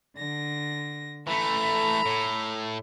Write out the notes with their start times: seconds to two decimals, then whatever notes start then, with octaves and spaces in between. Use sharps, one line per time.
0.17 D3 A#6
1.27 E3 A3 A4 A#5 B5
2.06 A2